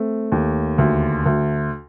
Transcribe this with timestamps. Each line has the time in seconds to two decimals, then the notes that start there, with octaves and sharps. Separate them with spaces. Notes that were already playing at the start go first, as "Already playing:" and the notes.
Already playing: A3 C4
0.32 D#2
0.78 D2
1.26 D2